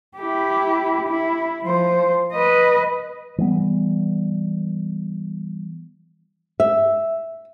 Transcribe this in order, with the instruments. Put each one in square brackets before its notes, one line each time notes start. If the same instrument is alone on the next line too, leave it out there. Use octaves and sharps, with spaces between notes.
[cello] E4 G4
E4
F3 C5
B4 D#5
[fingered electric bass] E3 G3 A3 B3
[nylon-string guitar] E5